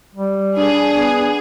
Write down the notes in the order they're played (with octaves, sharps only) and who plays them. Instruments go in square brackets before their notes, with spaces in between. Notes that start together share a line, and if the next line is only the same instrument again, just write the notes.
[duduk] G3
[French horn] D4 [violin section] G#4
[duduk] B3